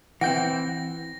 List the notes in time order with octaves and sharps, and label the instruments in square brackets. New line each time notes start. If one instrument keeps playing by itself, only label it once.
[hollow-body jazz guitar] E3 C4 [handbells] F#5 G5 G6 [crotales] A#6